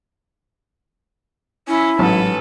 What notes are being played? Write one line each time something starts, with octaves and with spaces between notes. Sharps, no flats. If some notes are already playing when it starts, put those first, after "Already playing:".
C#4 E4
A1 G#2 F#3 C#4 A4 B4